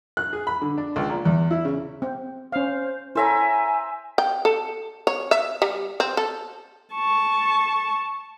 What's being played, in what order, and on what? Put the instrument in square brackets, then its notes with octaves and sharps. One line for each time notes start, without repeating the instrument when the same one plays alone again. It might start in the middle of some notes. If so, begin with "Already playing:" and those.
[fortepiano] F#6
G#4
B5
D3
D4
C#2
A#2
E2
E4
C#3
[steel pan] C4
[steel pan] C#4 F5 [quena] C5
[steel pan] E4 A4 C#5 [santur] C5 E5 A#5 [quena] G#5
[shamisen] G5
A4
C#5
E5
G3
C4
A4
[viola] A5 C#6